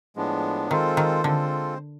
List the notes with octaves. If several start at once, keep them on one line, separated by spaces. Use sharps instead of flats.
A2 F3 G#3 B3 D4
D#3 G#3 C4 F4 A4 C5
D#3
D3 G#3 C4 F4 A4 C5